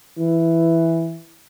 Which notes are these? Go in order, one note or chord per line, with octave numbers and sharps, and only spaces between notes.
E3